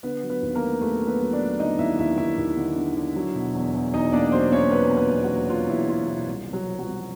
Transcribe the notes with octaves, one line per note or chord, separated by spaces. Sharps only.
D3 B3 B4
F#3
B3 B4
D#2
A#3 A#4
A3
D#2 A3 A4
A3
B3 B4
F#3
D4 D5
F#3
D3 D#4 D#5
D#2 E4 E5
D#2 E4 E5
D#2 E4 E5
D#2
D3
D3
D3
F#3
B2
E2
E2
E2 D#4 D#5
A#3 D4 D5
F#3 C4 C5
A#3 C#4 C#5
F#3 B3 B4
A#3
B3 B4
E2
F#3 F#4
A#3
B2 F4
E2 E4
F#3 F4
B2 E4
C2
C3
F#3 F#4
F3
F#3 F#4
C2